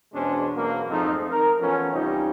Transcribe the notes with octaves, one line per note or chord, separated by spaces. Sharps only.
E2 B2 G#3 C#4 D4 C5
E2 B2 F#3 A#3
F2 G#2 F3 A3 C4 D#4
A#4
E3 F3 A3 B3 C#4
C2 F3 G3 C#4 D#4 G4